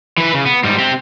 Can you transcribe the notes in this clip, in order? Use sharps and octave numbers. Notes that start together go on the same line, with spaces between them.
E3 B4
C#3
B3
G#2 G3
C4 G4